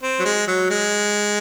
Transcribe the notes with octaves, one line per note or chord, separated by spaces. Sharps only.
C4
F#3
G#3
F#3
G#3